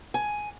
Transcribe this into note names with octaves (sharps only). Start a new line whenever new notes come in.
G#5